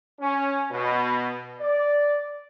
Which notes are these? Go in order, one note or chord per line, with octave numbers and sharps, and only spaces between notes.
C#4
B2
D5